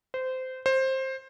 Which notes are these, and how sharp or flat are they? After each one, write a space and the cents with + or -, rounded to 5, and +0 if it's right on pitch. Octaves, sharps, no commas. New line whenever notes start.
C5 -20
C5 +15